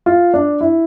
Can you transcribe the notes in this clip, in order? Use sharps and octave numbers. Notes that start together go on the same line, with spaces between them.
F4
D4
E4